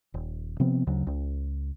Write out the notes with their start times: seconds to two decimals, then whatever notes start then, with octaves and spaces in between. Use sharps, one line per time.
0.14 D#1
0.60 C3 F3 B3 C4
0.87 D2 C#3 F#3
1.07 C#2